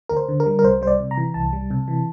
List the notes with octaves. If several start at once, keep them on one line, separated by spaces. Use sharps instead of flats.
D2 A#4
C5
D3
A#4
G3
A#4
C2 C5
G3 C5
D5
C3
A#5
E3
C2 A5
G3
C3
E3